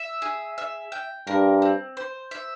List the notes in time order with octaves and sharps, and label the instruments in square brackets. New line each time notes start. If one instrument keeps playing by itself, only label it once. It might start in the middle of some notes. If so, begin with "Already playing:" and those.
Already playing: [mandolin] E5
G#4
E5
G5
[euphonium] G2 [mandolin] A#4
[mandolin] C4
C5
E5